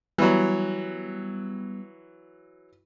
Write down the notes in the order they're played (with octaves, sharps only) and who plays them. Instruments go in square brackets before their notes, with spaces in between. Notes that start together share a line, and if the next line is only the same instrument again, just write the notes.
[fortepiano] E3 F#3 [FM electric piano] G3 B3